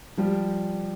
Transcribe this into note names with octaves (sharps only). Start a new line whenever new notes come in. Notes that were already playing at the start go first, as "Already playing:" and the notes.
F3 G3